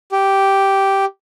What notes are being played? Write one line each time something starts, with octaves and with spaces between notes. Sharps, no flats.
G4